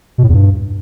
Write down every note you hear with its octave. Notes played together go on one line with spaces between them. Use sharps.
B2
A2
E2
G2